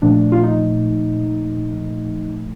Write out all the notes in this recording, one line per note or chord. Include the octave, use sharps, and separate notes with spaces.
A#2 F3 A3 D4
F4
D#4